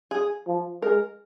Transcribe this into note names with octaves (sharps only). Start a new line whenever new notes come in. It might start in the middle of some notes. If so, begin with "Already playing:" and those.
G#4
F3
G#3 A#4